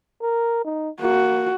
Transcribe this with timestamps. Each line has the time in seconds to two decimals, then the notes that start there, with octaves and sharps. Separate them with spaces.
0.21 A#4
0.64 D#4
1.01 A#3 F#4